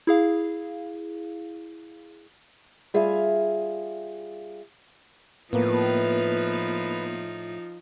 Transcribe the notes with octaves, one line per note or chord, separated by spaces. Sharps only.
E4 G#4 F5
G3 F4 G#4 E5 F5
A2 F3 A#3 B3 D#4 F4 B4